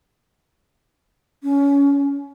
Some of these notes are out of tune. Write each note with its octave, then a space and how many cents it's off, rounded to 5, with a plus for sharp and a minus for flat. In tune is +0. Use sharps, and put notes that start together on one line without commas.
C#4 +25